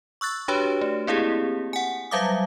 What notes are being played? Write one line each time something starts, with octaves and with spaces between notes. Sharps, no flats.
C#6 E6 F#6 A6
D4 F#4 G4 B4 C#5
A3
A#3 C4 E4 G4 G#4
F#5 G#5
F#3 G3 E5 F5 D6 D#6